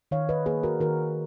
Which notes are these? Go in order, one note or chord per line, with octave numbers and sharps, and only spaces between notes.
D#3 C#5 F5
B4 D#5
A#3 G#4 B4
F#4 A#4
D#3 F#4 A#4